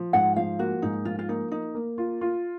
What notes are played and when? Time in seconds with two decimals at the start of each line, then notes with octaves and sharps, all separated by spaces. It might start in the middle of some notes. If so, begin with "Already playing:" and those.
Already playing: F3
0.13 G#2 F#5
0.36 F3 F5
0.59 A#3 F#4
0.82 G#2 D#4
1.05 F3 F4
1.19 F4
1.29 A#3 D#4
1.52 A#3 D#4
1.75 A#3
1.98 F4
2.21 F4